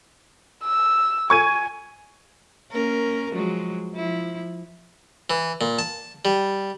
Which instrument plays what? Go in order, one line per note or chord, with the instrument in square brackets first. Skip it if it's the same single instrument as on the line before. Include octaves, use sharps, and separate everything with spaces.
[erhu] E6
[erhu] G#5 [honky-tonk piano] C#6 G#6 D#7
[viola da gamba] A#3 C#4 A#4
F3 F#3 G#3
F3 E4
[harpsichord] E3
A#2
A5
G3